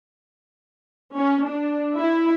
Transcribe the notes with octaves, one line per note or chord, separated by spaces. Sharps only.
C#4
D4
E4